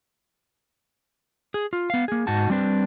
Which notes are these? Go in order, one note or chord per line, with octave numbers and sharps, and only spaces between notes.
G#4
F4
B3 F5
A#3 G#4
G#2 D#4 F#4 A5
G3 C4 D4 B4